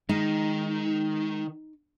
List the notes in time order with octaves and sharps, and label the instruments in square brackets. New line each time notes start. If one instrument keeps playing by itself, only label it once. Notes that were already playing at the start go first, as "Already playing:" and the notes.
[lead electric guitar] D#3 [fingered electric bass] G#3 [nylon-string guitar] D#4